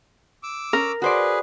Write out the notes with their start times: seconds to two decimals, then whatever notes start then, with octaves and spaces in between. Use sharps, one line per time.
0.43 D6 E6
0.73 C#4 A#4
1.02 F#4 G#4 B4 C5 D5